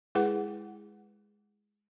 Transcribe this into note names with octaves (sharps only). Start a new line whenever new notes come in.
G#3 E4 G#4 B4 F#5